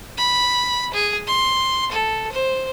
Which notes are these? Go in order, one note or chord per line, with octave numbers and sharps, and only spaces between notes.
B5
G#4
C6
A4
C5